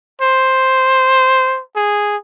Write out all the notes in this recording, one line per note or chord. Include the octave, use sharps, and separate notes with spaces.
C5
G#4